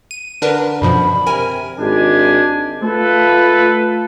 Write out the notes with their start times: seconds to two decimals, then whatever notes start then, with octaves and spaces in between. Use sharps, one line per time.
0.11 D#7
0.42 D3 D4 A#4 B4
0.82 F#2 B2 D3 F3 B5
1.26 C3 A#4 G#5
1.79 G#1 G#3 D4 G4 G#5
2.82 A3 F4 A4 B4